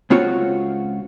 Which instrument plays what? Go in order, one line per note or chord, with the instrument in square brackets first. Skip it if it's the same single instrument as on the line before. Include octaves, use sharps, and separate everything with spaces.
[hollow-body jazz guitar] C#2 C4 F4 F#4 C#5